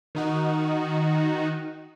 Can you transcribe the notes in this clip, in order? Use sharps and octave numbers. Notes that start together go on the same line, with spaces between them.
D#3 D#4 F#4